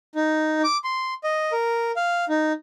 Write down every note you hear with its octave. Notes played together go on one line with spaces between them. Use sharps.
D#4
D6
C6
D#5
A#4
F5
D#4